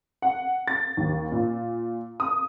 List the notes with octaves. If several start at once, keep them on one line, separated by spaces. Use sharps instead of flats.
F#5
A6
D#2
A#2
D#6